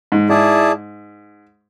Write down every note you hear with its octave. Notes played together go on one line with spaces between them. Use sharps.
G#2
G#2 E4 G#4 D5 A5